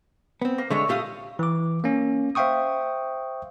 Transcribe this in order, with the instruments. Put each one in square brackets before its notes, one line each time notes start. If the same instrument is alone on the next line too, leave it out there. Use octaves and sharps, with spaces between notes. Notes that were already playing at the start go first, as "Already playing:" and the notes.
[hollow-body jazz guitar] B3 C4
[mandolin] A#3
[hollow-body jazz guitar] D3 G#3 [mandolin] A3 C#5
[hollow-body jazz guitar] A#2 G4 F5 [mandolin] A3 D#6
[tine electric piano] E3 D6
A#3 C#4
C5 E5 F5 G5 C#6 D#6